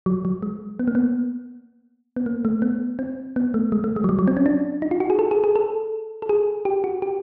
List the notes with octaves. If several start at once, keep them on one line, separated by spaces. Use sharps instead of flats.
F#3
F#3
G#3
B3
A#3
B3
B3
A#3
A3
B3
C4
B3
A3
G#3
A3
G#3
F#3
G3
F#3
C4
C#4
D4
D#4
F4
F#4
G#4
A4
G#4
G#4
A4
A4
G#4
G4
F#4
G4